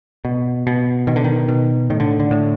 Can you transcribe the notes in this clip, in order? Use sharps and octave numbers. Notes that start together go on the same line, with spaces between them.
B2
B2
B2 D#3
D3
D#3
B2
A2 D#3
D3
D3
A2